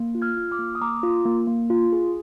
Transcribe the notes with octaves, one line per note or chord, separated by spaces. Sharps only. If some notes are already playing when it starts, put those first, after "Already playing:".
Already playing: A#3
F4
F6 G#6
F4
D6 F6
A#3
D#6
A#3 A#5 D6
F4
A#3
A#3
F4
G#4